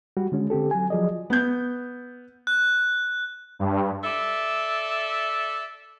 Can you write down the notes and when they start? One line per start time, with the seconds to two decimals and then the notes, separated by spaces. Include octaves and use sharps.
0.17 G3 F#4
0.32 D3 G#3 C#4
0.50 D3 C4 G4 A4
0.71 F#3 G#5
0.90 F3 F#3 G#4 D5 D#5
1.30 B3 G6
2.47 F#6
3.59 G2
4.04 A4 D5 E5